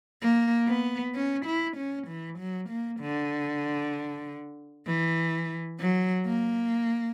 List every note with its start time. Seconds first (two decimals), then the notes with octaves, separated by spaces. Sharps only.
0.22 A#3
0.68 B3
1.15 C#4
1.45 E4
1.77 C#4
2.07 E3
2.39 F#3
2.69 A#3
3.00 D3
4.87 E3
5.80 F#3
6.26 A#3